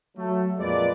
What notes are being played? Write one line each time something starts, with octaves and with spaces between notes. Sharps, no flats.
F#3 A3
F2 A#2 G#3 B4 D5